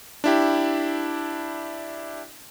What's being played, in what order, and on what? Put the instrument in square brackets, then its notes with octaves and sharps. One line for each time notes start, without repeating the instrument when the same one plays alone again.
[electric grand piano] D4 E4 G4